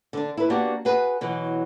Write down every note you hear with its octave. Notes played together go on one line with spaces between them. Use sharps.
D3 D4
E4 B4
A#3 B3 D4 F#4 G4
F#4 G#4 B4
B2 E3 F#3